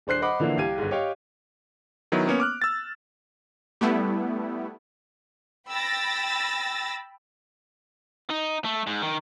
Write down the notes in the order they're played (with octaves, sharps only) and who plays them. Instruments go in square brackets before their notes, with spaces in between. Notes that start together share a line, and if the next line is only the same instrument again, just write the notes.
[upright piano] D#1 D4 C5 F#6 C7
C5 D#5 F#5 B5 D6
D3 E3 F3 A#3 D4 E4
C2 G4 F5 G#6 D#7
G1 G#2
G4 C#5 D#5 F5 G5
[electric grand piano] D#3 F#3 B3 E4
A#3 B3 C#4 C#5
D6 F6 F#6
E6 A6
[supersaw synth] G3 A3 B3 E4
[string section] G5 B5 E6 A6 A#6
[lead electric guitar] D#4
A3
G#2
D#3